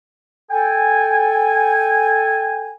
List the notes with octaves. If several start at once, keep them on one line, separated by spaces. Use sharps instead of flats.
A4 G5 G#5